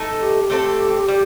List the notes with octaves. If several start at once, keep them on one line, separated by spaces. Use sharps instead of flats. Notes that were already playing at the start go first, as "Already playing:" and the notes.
Already playing: A3 D#4 A4
G4
A3 C4 F4 A4
G3